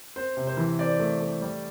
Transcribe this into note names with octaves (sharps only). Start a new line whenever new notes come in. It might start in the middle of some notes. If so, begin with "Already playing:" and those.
C4 C5
C3
C5
E3
C4 D5
A3
A3
G3